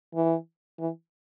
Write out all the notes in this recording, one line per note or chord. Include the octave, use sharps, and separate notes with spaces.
E3
E3